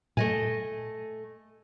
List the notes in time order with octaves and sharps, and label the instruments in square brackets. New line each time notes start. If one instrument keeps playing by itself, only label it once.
[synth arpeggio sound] A#2 [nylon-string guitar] A3 D#5 G#5